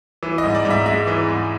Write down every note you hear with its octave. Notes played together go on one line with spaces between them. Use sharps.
E3
D#5
G#2
D5
G#2
E5
G#3 E5
E3
G#2